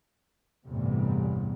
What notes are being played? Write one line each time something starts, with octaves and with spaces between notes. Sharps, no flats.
A1 E2 G2 C3 G3